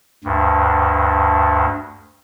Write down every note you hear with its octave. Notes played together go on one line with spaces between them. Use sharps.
D2 G2